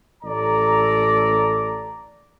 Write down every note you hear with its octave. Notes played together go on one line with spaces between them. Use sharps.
A1 A4 D5 A#5